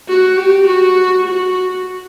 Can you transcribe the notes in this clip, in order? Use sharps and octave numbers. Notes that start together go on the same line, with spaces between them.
F#4
G4
F#4
F#4